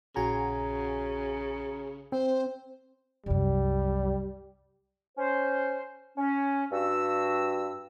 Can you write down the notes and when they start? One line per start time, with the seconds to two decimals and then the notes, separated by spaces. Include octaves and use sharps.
0.16 A#1 C#3 F#4 G#5 A#5
2.12 C4 C5
3.26 C2 F#2 G3
5.18 C#4 C5
6.17 C#4
6.72 G2 F#4 E6